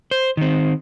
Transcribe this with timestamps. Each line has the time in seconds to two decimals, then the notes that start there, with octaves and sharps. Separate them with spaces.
0.11 C5
0.37 D#3 C4